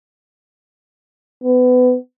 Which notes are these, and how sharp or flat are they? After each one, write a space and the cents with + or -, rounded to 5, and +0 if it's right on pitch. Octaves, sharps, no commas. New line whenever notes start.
B3 +25